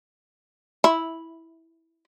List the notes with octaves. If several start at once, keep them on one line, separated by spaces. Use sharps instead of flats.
E4